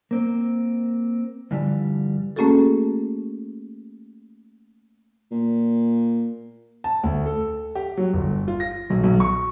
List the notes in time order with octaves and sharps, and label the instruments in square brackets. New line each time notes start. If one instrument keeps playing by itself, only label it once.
[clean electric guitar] A#3 C4
G2 D3 E3 F3 G3
[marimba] A3 A#3 C#4 F#4 G#4 A4
[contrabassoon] A#2
[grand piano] A5
D2
A4
G4
F#3
G1
F4
A#6
B1
B1
C#6